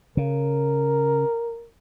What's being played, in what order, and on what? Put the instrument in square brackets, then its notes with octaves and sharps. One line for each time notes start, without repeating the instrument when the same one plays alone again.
[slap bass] C#3 [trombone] A#4